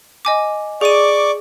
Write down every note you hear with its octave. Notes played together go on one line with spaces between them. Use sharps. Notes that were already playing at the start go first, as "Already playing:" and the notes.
D#5 G#5 D6
G#4 D5 C#6 D6 D#7